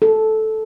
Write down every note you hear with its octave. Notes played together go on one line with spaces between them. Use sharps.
A4